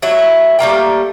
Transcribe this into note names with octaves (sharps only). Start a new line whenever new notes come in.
F#3 A3 E4
G3 A3 A#3 G5